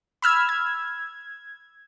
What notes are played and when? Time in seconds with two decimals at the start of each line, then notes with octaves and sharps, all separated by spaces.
0.22 B5 E6 F6 G#6
0.49 G#6